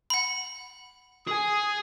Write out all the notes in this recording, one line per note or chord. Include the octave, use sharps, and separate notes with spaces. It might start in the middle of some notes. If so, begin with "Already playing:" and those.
F#5 B5
G#4 G#5 D#6